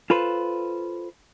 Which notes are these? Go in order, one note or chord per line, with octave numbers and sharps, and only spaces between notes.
F4 A4 B4 C5